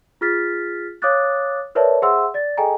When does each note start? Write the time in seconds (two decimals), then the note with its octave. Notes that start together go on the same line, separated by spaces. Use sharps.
0.21 F4 G#4 F6 A6 B6
1.02 C#5 F5 D6 D#6 F#6 A6
1.75 A#4 B4 C#5 D5 E5 A5
2.02 G#4 C5 E5 F#5 C6 E6
2.34 D5 A6
2.57 G#4 A4 D#5 G5 G#5 A#5